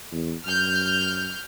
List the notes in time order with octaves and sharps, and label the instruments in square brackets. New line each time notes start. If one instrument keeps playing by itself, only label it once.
[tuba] E2
[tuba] F#2 [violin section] F6 G6